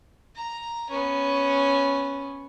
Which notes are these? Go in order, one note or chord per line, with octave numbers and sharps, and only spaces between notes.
A#5
B3 C#4